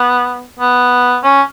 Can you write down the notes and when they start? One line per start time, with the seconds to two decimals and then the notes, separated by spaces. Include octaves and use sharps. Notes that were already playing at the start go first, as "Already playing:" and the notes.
Already playing: B3
0.59 B3
1.24 C#4